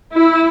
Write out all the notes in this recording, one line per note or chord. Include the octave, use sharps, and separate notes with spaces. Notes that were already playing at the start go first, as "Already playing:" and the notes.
E4